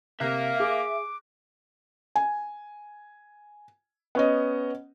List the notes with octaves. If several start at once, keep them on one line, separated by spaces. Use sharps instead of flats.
C3 A#3 E5 F#6 A#6
G#4 D6
G#5
B3 C#4 D#5